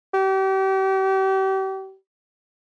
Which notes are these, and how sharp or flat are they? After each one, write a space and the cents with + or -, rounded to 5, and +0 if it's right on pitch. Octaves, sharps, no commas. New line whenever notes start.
G4 -35